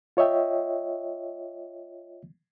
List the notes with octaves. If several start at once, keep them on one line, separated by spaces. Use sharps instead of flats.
F4 C#5 D#5 E5 G5